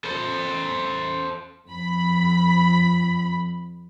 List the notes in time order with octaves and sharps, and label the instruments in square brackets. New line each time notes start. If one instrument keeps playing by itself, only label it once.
[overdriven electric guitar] A4 C5
[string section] F2 B5